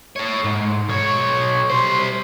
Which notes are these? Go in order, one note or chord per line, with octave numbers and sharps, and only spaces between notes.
A4 C#5
G#2
B1 C#5
G3 C5